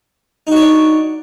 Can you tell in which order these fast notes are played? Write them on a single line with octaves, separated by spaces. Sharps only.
D#4 F#4 C#5 D4